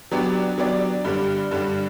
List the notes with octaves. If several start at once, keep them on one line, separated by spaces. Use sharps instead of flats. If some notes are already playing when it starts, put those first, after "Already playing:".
F#3 B3 D4 G4 D5
F#3 B3 D4 G4 D5
G2 D3 G3 D4
G2 D3 G3 D4